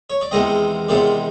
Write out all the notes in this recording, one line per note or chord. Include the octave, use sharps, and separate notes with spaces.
C#5
D5
E2 C3 D#3 G#3 C4 D#5
E2 C3 D#3 G#3 C4 D5